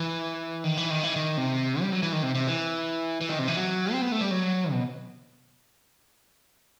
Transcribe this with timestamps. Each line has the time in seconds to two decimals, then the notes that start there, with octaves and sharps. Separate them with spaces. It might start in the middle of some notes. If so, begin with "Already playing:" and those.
Already playing: E3
0.64 D#3
0.77 E3
0.90 D#3
1.03 E3
1.16 D#3
1.37 C3
1.81 G3
1.92 F#3
2.03 E3
2.12 D#3
2.23 C3
2.35 C3
2.47 E3
3.21 E3
3.29 D#3
3.39 C3
3.48 E3
3.57 F#3
3.93 C4
4.02 B3
4.12 A3
4.21 G3
4.31 F#3
4.72 B2